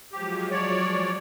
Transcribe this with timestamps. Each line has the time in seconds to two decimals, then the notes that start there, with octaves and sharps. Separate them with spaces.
0.12 F3 F#3 G#3 G4
0.51 C#5 D5